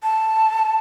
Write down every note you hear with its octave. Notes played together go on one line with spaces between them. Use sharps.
A5